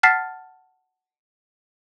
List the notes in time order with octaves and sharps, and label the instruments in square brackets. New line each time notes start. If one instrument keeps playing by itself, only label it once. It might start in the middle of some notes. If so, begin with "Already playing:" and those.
[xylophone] F#5 A5 F6 A6 B6 C7